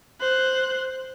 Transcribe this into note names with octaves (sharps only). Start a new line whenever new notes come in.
C5 F#6